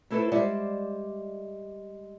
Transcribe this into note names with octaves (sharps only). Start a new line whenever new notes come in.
A3 E4 A4 B4 C5
G3 G#3 C5 D5 E5 F#5